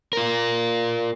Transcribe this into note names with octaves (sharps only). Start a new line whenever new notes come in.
F4 A#4